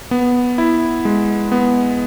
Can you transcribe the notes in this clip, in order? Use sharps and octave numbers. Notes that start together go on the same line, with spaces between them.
B3
E4
G#3
B3